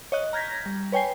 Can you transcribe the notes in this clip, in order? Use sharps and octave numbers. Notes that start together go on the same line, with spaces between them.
C#5 D#5 F#6
A#5 F6 G6 G#6 A#6 B6
G3
B4 C#5 G5 G#5 C7